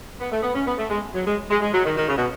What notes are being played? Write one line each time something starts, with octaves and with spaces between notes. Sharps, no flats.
B3
A3
B3
C#4
B3
A3
G#3
F#3
G#3
G#3
G#3
F#3
D#3
D#3
C#3
B2